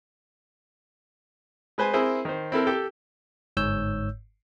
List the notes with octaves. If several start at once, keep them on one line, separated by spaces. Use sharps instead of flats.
G#3 B4 C5 G#5
C4 E4 G#4 A#4 C5
D#3 C5
C4 E4 A4 A#4
G4 A4 G5
G1 G#2 C#5 E6 G6